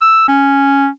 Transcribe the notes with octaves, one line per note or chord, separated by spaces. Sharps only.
E6
C#4